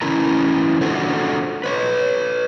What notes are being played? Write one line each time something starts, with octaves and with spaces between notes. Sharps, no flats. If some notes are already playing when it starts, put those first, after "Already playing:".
E3 C#4 E4 A#4 A#5
D4 F4 F#4 A4 C5
B4 C#5